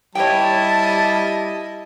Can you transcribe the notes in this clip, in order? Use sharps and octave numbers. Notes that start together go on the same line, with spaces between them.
G3 E4 C#5 D#5 G5 A5